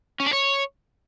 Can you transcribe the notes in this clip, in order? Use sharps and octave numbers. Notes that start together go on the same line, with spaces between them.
C#4
D4
C#5